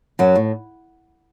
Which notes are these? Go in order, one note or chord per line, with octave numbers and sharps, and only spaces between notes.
F#2 F#3
A2